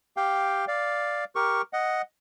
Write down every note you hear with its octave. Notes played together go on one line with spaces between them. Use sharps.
G4 F5 G5
D5 F5
G4 A#4 C#6
D#5 F#5